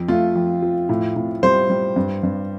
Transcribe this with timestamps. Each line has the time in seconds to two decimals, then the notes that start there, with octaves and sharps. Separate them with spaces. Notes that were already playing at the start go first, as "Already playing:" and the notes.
Already playing: F2
0.08 A3 F4
0.35 F2
0.62 F3
0.89 A2
1.16 A2
1.43 G3 C5
1.70 G3
1.96 G2
2.23 G2